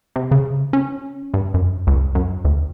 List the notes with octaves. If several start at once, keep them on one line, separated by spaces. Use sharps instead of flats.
C3
C#3
C#4
G2
F#2
C#2
F#2
D2